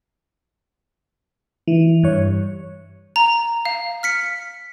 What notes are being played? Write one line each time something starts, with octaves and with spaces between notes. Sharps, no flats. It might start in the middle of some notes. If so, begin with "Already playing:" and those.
E3
G2 C#5
A#5
F5
F6 B6 C#7